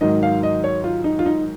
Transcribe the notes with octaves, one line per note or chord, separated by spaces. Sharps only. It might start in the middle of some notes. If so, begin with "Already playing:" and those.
G#2 D#3 F#3 D#5
F5
D#5
C#5
F4
D#4
F4
D#4